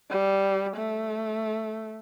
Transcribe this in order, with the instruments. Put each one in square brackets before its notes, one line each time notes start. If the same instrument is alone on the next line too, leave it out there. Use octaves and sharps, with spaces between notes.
[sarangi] G3
A3